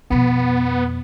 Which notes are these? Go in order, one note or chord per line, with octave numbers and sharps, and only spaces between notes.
F2 B2 B3